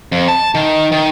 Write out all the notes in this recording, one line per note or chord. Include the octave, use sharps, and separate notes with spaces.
F2
A5
D#3
D#3